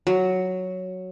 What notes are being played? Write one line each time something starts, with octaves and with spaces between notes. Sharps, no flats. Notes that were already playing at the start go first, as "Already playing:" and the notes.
F#3